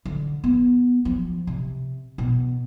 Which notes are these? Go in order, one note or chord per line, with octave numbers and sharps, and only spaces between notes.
D3
B3
F3
C3
B2